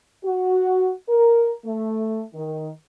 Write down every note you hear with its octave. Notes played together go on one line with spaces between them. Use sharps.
F#4
A#4
A3
D#3